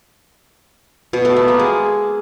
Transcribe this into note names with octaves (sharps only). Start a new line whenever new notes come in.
B2
A3
B3
A#3
G#3